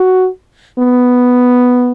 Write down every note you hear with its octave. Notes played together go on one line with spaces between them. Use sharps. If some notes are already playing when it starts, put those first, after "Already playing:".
Already playing: F#4
B3